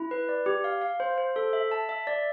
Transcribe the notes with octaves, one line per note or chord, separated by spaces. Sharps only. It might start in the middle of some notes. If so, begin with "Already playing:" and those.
Already playing: E4
B4
D5
G4
F5
F5
C5
C5
A4
E5
A5
E5
D5